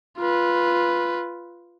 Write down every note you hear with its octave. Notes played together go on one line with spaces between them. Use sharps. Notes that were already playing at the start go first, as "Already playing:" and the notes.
F4 B4